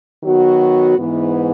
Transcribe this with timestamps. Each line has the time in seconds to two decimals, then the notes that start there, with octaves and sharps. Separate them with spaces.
0.23 D#3 F#3 B3 F#4
0.98 G#2 E3 B3